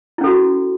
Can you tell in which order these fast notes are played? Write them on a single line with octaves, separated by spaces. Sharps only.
E4 C#4 A4 F#4